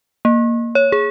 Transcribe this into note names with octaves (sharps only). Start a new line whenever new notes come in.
A#3
C#5
G#4